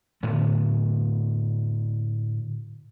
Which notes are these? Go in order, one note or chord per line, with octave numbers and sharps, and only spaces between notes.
A2 D3 A3 B3